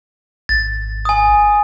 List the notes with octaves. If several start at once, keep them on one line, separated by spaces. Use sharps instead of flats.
G#1 A6
G#5 D#6